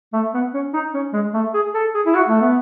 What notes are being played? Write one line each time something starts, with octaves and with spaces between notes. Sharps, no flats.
A3
B3
C#4
D#4
C#4
G#3
A3
G#4
A4
G#4
E4
F#4
A3
B3